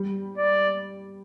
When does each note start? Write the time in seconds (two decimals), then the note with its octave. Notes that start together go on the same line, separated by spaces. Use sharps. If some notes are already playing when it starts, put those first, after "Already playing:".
Already playing: G3
0.37 D5